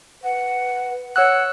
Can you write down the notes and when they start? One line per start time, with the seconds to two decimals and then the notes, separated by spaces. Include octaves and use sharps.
0.24 B4 F#5
1.16 C#5 F#5 E6 F#6